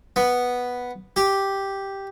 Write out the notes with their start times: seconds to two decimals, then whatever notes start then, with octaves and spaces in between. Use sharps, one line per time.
0.16 B3
1.16 G4